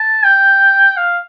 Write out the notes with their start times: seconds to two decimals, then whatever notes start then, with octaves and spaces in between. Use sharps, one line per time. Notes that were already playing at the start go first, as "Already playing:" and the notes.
Already playing: A5
0.25 G5
0.97 F5